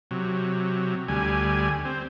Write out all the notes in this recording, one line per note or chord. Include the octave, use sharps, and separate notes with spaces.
C3 F#3
D2 G3 G#5
C4